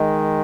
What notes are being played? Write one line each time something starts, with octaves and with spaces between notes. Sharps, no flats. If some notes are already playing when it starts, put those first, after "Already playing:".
Already playing: D#3 G#3